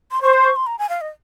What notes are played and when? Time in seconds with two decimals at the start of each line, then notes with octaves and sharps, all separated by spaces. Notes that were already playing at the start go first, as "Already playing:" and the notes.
0.12 C6
0.22 C5 C#6
0.33 C6
0.44 C#6
0.56 C6
0.66 A#5
0.79 G#5
0.89 F5
1.01 D#5